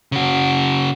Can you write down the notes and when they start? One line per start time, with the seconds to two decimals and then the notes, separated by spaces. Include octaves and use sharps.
0.12 C#3 F#4